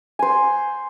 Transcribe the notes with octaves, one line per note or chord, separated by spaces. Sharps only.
C5 G#5